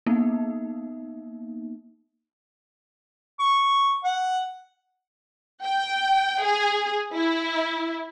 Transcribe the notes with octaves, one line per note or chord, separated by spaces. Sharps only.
A#3 B3 D#4
C#6
F#5
G5
G#4
E4